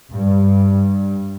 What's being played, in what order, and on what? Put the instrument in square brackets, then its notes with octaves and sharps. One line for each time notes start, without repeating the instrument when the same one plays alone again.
[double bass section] G2